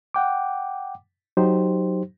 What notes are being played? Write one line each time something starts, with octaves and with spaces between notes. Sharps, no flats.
F#5 G5 D6
F#3 D#4 G4 C5